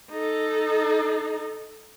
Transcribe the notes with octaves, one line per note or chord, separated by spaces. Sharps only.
D#4 A4